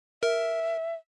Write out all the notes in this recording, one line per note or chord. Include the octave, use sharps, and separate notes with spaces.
A#4 E5